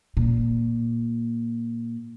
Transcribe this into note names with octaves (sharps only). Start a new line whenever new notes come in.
A#2